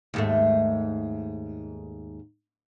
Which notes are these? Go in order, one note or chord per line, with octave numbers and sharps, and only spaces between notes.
D#2 G#2 A3